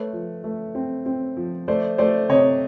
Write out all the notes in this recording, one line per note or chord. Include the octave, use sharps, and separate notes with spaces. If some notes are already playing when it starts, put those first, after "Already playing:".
Already playing: A3 B4 C#5
F3
A3
C4
C4
F3
A3 C5 D5
A3 C5 D5
C3 C#5 D#5